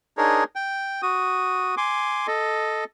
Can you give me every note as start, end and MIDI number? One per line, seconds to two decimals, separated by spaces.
0.17 0.44 62
0.17 0.44 63
0.17 0.44 68
0.17 0.44 70
0.17 0.44 73
0.56 1.02 79
1.02 1.75 66
1.02 1.75 87
1.77 2.27 80
1.77 2.27 84
1.77 2.27 86
2.27 2.84 69
2.27 2.84 75